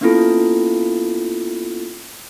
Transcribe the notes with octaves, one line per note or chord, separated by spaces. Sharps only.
A#3 B3 C#4 E4 F4 A4